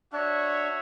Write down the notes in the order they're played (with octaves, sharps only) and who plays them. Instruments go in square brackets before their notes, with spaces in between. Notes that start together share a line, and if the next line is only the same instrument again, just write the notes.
[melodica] D4 [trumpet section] F#4 C#5 E5